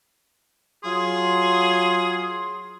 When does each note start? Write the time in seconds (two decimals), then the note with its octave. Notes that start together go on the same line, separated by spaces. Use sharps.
0.84 F#3 F4 G#4 C6